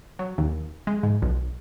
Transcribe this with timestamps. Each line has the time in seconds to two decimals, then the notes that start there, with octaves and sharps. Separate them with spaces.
0.19 F#3
0.38 D#2
0.87 G#3
1.03 G#2
1.22 B1